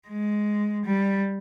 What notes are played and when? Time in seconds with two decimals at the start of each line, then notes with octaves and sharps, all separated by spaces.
0.08 G#3
0.85 G3